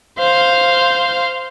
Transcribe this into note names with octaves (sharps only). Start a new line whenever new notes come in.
C5 F5